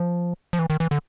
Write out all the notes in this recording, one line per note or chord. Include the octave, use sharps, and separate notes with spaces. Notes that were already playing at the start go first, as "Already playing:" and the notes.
Already playing: F3
F3
E3
D#3
E3
D3